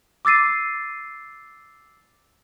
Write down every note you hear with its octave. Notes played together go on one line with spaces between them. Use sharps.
D6 E6 A6 C7 D#7